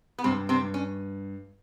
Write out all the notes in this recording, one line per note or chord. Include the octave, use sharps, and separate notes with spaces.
B3
G2 C3 C4
C3 C4
G2
C#4